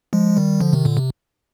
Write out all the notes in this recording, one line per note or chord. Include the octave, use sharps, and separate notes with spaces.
F3 G#3
D#3 G3
D3 F3
C3 D#3
A#2 D3
C3